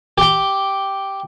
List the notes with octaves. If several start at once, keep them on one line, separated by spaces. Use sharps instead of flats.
G4 G5